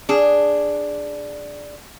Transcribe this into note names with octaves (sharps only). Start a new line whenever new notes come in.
D4 G#4